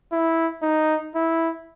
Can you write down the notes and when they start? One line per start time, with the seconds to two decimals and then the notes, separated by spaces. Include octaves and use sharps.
0.12 E4
0.62 D#4
1.15 E4